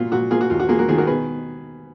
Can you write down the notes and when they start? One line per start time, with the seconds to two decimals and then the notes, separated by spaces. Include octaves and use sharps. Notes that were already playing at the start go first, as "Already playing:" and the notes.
Already playing: A#2 F4 F#4
0.12 A#2 F#4
0.31 A#3 F4 G#4
0.41 F#4
0.50 D#2 F4
0.60 F#4
0.69 A#3 F4 G#4
0.79 F#4 A#4
0.88 D#3 F4 G#4
0.98 F#4 A#4
1.07 B2 G#4 B4